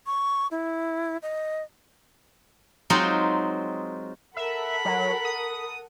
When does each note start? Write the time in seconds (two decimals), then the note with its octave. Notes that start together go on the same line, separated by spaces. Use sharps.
0.06 C#6
0.51 E4
1.22 D#5
2.90 F#3 G#3 C4 D#4 F4 F#4
4.37 A4 A#4 E5 F#5 B5
4.85 F#3
5.25 D#6